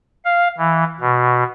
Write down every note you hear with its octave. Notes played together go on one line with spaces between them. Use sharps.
F5
E3
B2